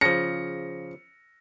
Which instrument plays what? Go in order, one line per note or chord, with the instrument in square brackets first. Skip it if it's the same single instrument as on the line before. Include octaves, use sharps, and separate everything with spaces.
[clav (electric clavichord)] C#3 F3 [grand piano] A#6 C#7